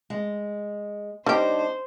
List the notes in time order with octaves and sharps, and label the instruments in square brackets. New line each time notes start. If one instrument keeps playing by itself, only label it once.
[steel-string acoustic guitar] G#3
[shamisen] G3 G4 [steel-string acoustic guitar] D4 D#4 C#5 [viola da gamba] C5